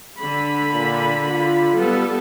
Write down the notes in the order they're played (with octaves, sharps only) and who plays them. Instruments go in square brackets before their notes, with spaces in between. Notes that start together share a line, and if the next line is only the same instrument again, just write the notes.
[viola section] D3 B5
[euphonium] A#2
F4
[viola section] G3 B3 A4